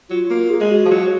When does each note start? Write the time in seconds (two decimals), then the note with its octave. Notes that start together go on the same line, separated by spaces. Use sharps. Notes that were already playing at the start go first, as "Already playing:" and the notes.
0.10 F#3 F4
0.30 A#3 F4
0.50 G#4
0.61 G#3
0.71 F#4
0.85 F3
0.91 F#3